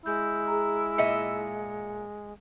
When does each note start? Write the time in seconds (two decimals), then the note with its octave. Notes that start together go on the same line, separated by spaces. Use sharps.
0.06 G#3 E4 G6
0.47 G#4 A#5
0.98 A#2 D#5 E5 C#7